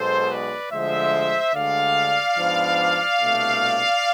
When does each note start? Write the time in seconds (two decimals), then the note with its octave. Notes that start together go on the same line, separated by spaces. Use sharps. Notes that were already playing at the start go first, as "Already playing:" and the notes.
Already playing: B1 B2 G#3 A4 C5
0.30 B4 D5
0.71 D2 D3 F3 G#3 C5 E5
1.54 D2 D3 G#3 D4 D5 F5
2.36 G#2 F3 B3 D4
3.19 C2 B2 A3 D4